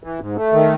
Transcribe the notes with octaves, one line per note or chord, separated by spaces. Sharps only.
E3
G#2
A3
D#3